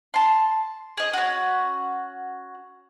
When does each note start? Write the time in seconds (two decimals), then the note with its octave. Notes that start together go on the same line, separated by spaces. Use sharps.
0.14 A5 C6
0.97 G#4 D#5
1.13 C#4 F#4